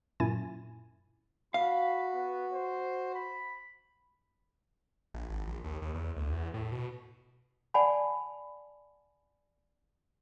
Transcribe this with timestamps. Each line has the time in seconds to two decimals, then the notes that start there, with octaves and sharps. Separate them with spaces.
0.20 F#2 A#2 E4 G#5 A6
1.54 F#4 F5 B5
2.14 B3
2.52 C5
3.14 B5
5.14 A#1
5.30 G#1
5.47 A#1
5.64 D#2
5.82 D#2
5.95 E2
6.17 D2
6.32 E2
6.54 A2
6.72 B2
7.74 D5 F#5 G#5 A5 B5